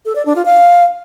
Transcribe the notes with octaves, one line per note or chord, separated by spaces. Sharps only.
A4
D5
D4
F4
F5